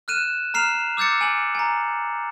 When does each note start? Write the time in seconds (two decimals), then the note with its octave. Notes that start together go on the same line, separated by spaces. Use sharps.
0.08 F6 F#6 D#7 E7
0.54 A#5 F6 C7 E7 F7
0.97 D6 E6 G6 A6 C#7
1.21 G#5 F#7
1.55 G#5 A#5